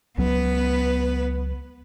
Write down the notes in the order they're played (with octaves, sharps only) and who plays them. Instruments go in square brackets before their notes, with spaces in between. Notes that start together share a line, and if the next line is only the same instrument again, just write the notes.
[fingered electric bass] C#2 F#3 [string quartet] B3 B4